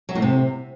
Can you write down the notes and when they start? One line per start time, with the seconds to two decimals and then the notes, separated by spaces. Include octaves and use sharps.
0.09 F#3
0.15 A2
0.22 C3